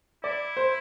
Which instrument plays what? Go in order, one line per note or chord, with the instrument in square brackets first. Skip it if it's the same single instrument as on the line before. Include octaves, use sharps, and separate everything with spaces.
[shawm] E4 [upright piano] D5
[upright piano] C5